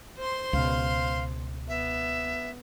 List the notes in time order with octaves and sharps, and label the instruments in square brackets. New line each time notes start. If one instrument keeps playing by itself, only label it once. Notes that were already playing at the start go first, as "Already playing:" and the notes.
[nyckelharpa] C5 C6
[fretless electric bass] C#2 B2 [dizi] F5
[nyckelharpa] B3 [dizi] E5